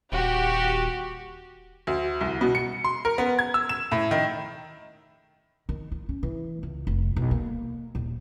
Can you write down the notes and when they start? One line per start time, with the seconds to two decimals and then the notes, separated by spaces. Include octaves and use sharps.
0.12 D#1 F#4 G4
1.87 D2
2.21 C2
2.41 B2
2.55 C#7
2.84 C6
3.05 A#4
3.18 B3
3.39 G#6
3.54 E6
3.69 E7
3.92 A2
4.11 D#3
5.69 D#3
5.92 F4
6.09 C#4
6.23 E3
6.63 C#2
6.87 F1
7.16 B1
7.31 A#3
7.95 D#1